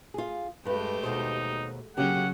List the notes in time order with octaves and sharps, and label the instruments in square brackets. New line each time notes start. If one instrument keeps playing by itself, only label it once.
[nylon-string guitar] F4 G#4
[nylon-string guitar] G2 B4 [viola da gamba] G#3 A3 G4
[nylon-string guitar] D#2 B2 C5 [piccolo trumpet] D#4
[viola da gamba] C#3 F#3 C#4 [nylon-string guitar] A#3 G4 [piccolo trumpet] F#5